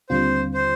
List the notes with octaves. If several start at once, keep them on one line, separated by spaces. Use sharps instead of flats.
D#2 D3 G3 C4 F4 C5
C5